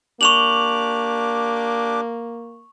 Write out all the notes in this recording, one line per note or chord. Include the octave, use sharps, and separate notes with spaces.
A#3 D4 G4 C#6 D6 F7 F#7